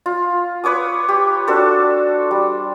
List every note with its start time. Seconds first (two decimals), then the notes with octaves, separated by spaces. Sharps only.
0.06 F4
0.64 B4 C#5 D6 D#6
1.09 G4
1.47 D4 F#4 A4 C5
2.31 G3